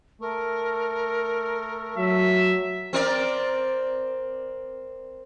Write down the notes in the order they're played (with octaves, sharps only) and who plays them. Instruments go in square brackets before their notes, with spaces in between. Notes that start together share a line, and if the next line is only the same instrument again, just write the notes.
[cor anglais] A3 [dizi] A#4
[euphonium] F#3 [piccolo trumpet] E5
[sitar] C4 A#4 D5